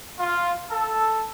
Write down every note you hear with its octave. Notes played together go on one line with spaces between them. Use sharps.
F4
A4